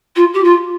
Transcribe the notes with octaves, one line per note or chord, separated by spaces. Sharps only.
F4
G4
F4